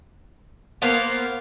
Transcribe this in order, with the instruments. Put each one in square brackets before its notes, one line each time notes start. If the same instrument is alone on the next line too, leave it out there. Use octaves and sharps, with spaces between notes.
[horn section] A#3 [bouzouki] B3 C5 F5